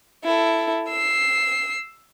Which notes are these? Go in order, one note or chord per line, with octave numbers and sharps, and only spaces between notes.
E4 A4
E6 C7